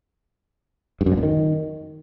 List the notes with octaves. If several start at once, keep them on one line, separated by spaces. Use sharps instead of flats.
G2
F#2
B2
A#2
D#3